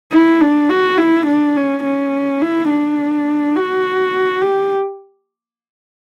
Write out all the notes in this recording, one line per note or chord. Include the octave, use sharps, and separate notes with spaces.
E4
D4
F#4
E4
D4
C#4
C#4
E4
D4
F#4
G4